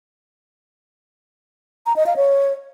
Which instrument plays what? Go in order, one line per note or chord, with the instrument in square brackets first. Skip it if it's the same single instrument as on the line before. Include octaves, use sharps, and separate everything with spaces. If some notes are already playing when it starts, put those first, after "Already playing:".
[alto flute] A#5
D#5
F5
C#5